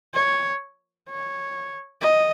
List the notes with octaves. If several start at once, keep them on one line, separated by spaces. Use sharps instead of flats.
C#5
C#5
D#5